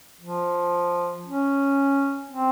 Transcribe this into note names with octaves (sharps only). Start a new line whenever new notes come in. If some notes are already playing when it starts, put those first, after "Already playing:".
F3
C#4
C4